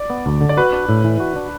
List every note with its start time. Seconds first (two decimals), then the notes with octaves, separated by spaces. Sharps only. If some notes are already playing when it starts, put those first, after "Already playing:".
Already playing: D5
0.10 B3
0.26 D2
0.41 D3
0.49 D5
0.57 F#4 B4
0.73 D4
0.89 A2
1.04 E3
1.20 F#4
1.36 D4